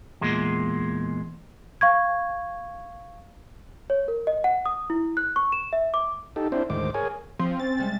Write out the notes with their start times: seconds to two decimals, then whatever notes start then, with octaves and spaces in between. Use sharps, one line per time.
0.21 E2 A#2 G#3
1.81 F5 C#6 G#6
3.90 C#5
4.08 A#4
4.27 D#5
4.44 F#5
4.66 D#6
4.90 E4
5.17 F#6
5.36 C#6
5.52 E7
5.73 E5
5.94 D6
6.36 D#4 G4 A4
6.52 C4 D4 E4 C5
6.70 D2 G#2 D#3 C5 D6
6.94 G#4 A#4 C#5 G#5
7.39 F3 C4 C6
7.60 C#4 A6
7.78 C3 G3 G#3